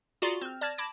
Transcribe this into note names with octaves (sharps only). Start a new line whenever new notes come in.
F4 F#4 G#4 D5 A#5 C6
C4 F6
D5 A5 F6 G#6 A#6
A5 B5 D6 G#6 A#6 D7